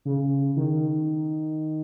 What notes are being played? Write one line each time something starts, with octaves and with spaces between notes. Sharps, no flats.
C#3
D#3